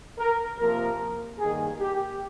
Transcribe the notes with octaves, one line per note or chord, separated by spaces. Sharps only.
A#4
C3 F3 A#3 A#4
G2 D#3 A#3 G#4
G4